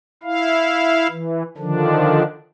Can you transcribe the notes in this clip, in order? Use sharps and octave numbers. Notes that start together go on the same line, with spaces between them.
E4 F5
E3
D3 D#3 F3 D4